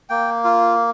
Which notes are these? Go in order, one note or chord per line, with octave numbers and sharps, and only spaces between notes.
A#3 G5
F4